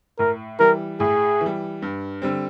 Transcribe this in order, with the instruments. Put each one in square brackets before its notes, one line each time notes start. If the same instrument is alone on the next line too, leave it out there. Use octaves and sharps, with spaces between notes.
[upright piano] A2 [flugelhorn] A#4
[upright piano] E3 G3 [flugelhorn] A#4
[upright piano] A2 [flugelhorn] G#4
[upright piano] E3
G3
G2
D3 G3 C4